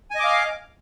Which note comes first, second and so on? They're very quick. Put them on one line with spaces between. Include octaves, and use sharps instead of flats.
G#5 D#5 D6 F5